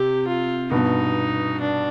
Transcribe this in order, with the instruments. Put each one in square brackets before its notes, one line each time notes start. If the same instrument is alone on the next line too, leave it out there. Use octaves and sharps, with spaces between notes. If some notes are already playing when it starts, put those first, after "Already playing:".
Already playing: [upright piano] C3 [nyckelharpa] G4
[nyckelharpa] F4
[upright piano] G2 B2 [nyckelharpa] D#4
[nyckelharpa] D4